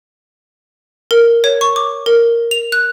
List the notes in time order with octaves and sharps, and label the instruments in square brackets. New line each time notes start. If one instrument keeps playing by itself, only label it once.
[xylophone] A#4
C#5
C#6
D6
A#4
F7
F#6